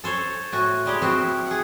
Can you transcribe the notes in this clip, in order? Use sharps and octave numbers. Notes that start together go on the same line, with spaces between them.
A4 C5 C#5
A2 F#4 G#5
G3 G#3 G4
F3 C4 E4 F#4 C5
G#4 F#5